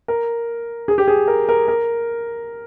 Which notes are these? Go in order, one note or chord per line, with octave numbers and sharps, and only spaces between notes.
A#4
G#4
G4
G#4
A#4
A#4
A#4